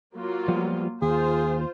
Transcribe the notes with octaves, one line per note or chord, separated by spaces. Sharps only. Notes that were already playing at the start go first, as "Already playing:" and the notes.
F#3 A#3 F4
F3 G3 B3
D#2 F4 G#4 C5